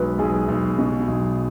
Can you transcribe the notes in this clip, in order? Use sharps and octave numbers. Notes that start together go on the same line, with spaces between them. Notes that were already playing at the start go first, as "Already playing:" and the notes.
Already playing: B1 F#3 G#3 B4
B1 G#4
B1
B2
B1